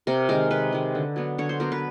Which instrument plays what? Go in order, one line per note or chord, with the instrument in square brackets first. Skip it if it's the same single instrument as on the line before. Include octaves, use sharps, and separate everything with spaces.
[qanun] C3 A#4
D#3 G#3 A#4
C3 B4
D#3 G#3
D3
F#3 B3 D4
D3 C#5
C5
F#3 B3 D4 A#4
B4